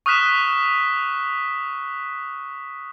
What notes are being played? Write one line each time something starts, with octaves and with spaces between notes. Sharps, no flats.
C#6 D#6 F6 F#6 B6 E7